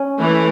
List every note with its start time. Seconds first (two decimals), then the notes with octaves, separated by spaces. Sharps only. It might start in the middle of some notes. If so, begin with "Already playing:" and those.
Already playing: C#4
0.20 E3 A3